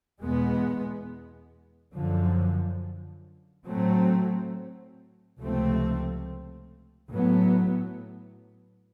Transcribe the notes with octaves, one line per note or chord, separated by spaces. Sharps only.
E2 B2 G#3 B3
F#2 D3 F3
A2 F#3 A3 C4
C#2 C3 F3 A3 C4
A2 F#3 B3